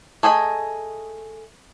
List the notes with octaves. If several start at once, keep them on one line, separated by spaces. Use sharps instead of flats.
A3 G#4 D#5 B5